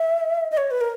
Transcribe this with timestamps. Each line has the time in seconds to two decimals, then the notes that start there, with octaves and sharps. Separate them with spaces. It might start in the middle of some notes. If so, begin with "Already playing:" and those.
Already playing: E5
0.51 D#5
0.57 C#5
0.71 B4
0.81 A#4